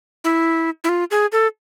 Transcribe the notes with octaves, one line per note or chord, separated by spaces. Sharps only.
E4
E4
F4
G#4
A4